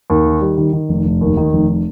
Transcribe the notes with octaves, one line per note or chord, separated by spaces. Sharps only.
D#2
D#3
G3
D#3
D#3
F1
F1
D#2
D#3
F1